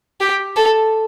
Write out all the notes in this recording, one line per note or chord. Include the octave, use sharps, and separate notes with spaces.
G4
A4